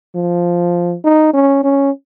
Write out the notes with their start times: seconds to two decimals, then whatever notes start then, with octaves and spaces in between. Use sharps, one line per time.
0.15 F3
1.04 D#4
1.33 C#4
1.64 C#4